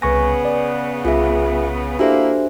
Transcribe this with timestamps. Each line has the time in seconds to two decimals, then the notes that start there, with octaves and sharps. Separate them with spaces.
0.02 C2 C#3 B3 B4 G#5 C#6 A#6
0.45 D5
1.05 C2 F4 G#4 E5
1.99 A#3 D4 E4 F#4 G4 A4 C5 E5